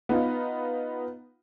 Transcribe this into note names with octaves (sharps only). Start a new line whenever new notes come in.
B3 D#4 F4